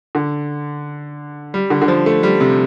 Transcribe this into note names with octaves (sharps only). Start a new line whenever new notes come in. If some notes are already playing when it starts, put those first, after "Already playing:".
D3
G3
D3
D3
F3
A3
G3
C3